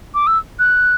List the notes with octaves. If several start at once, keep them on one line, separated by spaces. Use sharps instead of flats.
D6
E6
F#6